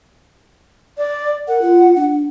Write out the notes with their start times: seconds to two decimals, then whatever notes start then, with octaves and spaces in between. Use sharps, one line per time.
0.98 D5
1.48 A#4 F#5
1.62 F4
1.96 D4